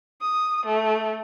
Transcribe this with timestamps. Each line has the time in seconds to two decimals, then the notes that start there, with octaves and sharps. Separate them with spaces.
0.21 D#6
0.66 A3